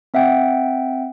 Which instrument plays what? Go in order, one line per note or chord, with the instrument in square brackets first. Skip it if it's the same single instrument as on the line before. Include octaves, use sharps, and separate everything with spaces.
[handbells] C4 E5 F#5 G5